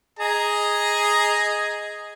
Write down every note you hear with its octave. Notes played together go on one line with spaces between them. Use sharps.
G#4 D#5 A#5